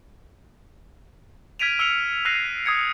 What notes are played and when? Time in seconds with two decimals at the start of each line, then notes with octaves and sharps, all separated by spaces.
1.59 F6 G#6 B6 D7 D#7 F7
1.79 E6 F6 C#7 F7
2.25 E6 F#6 A#6 C7 D#7
2.66 D#6 G#6 C#7